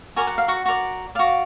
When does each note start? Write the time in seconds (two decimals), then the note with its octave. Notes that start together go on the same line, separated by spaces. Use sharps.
0.16 F#4 A#4 D5 G#5
0.27 F#5
0.38 F5
0.48 F#4 F#5
0.65 F#4 A#4 D5
1.15 F#4 D5 F5